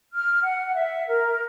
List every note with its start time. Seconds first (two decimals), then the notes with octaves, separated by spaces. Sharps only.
0.14 F6
0.43 F#5
0.73 E5
1.07 A#4